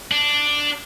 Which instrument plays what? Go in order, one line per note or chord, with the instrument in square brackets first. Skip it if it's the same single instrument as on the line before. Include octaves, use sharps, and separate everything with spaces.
[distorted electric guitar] D4